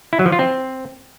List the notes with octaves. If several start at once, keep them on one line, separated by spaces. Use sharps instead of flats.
E4
F#3
F3
F4
C4